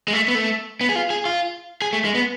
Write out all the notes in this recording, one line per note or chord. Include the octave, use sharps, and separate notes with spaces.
G#3
A3
B3
A3
B3
G#4
F4
G#4
F4
G#4
A3
G#3
B3